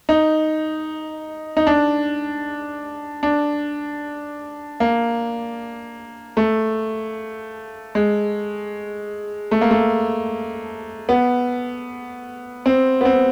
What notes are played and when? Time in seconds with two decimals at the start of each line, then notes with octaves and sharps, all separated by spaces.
0.09 D#4
1.57 D#4
1.67 D4
3.23 D4
4.80 A#3
6.37 A3
7.95 G#3
9.51 A3
9.61 A#3
9.71 A3
11.09 B3
12.66 C4
13.01 B3
13.05 C4